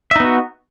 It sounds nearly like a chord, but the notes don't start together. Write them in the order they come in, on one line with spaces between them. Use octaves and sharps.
E5 D#4 B3 F#4